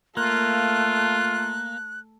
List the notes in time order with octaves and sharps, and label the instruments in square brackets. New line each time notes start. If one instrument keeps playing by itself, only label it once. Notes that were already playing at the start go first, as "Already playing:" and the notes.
[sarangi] A3 [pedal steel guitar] A#3 [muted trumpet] F4 [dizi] F#6